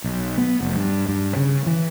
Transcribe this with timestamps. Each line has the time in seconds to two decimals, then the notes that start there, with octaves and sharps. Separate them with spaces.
0.04 B1
0.38 B3
0.60 F1
0.76 G2
1.09 G2
1.36 C#3
1.66 E3